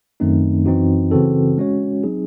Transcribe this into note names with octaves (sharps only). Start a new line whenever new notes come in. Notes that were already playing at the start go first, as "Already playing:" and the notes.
F#2 D#3 A3 C4 D#4
F#2 E3 C4 D#4 F#4
C#3 E3 C4 F#4 A4
G#3 C#4 F#4 C#5
F#3 C4 D#4 G#4